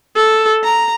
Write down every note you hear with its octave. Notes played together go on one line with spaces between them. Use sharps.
A4
A#5